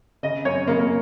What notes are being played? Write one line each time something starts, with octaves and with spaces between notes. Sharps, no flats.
C#3 D#5
F#2 C#5
C#3 A#3
A#3